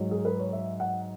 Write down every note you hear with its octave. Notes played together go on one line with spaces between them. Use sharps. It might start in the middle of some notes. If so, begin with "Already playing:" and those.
Already playing: G#2 F#3 C#5
G#4
B4
C#5
E5
F#5